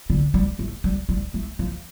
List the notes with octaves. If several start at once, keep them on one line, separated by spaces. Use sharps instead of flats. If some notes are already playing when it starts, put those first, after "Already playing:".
D3
G3
A3
G3
G3
A3
F3